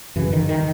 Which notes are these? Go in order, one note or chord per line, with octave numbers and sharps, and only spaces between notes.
F#2 C#3 E3
D#3
D#3